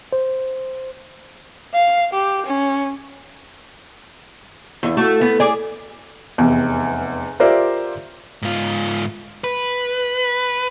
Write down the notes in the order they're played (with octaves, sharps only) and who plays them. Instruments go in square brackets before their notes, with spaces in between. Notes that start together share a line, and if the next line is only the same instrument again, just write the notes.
[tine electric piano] C5
[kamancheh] F5
G4
C#4
[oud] E2
A3 F#4
B3
G#4 D5
[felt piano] F1 E2
F4 G4 A#4 C5 D5 E5
[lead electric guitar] G#2 F4
B4